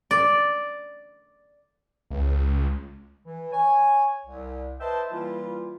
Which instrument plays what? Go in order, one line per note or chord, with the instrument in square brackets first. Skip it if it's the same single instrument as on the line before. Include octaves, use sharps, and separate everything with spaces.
[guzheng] D5
[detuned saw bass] C#2
[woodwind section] E3
C#5 G#5
C2
B4 C5 D#5 E5 G5 A5
E3 G3 A#3 E4 F4